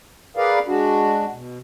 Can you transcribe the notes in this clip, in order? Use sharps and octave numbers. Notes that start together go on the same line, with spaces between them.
G#4 A#4 B4 D5 F5
G#3 D4 F#4
B2